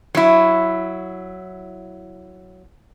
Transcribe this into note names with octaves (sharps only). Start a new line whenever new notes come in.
F#3 E4